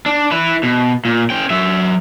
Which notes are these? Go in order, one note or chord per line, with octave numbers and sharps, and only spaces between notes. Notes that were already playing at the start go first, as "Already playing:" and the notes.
D4
E4 B4
B2
A#2
C#4 G5
F#3 E5